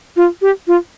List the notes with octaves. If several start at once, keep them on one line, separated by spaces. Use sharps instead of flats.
F4
G4
F4